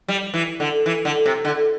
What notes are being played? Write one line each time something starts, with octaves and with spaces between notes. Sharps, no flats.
G3
E3
D3
E3
D3
C3
D3